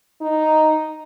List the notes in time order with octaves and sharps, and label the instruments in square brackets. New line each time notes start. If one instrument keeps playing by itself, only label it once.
[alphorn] D#4